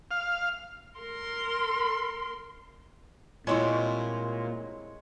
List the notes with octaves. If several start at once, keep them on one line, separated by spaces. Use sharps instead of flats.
F5
A#4 C6
A#2 G3 G#3 C4 E4 C#5 C6 C#6